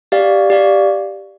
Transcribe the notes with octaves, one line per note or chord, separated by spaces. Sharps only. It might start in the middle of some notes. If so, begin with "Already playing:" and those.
G4 D5 F5
G4 D5 F5